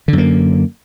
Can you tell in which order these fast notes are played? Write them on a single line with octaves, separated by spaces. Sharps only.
D3 F#2 A#3